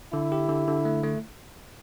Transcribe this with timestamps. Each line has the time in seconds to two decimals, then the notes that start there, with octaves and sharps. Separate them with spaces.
0.13 D3 E4
0.32 G4
0.49 D3
0.68 D3
0.85 A3
1.03 A3